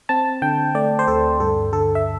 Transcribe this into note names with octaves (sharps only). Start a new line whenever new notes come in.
C4 A5
D3 G5
A3 D5
C5
D2 A4
G2 A4
D3 A4
E5